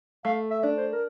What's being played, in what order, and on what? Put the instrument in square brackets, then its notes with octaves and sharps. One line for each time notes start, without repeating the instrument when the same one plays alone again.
[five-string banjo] A3 [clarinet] F5
[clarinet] E5
[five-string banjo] D4
[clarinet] C5
A#4